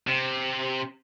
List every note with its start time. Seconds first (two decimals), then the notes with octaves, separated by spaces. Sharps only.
0.07 C3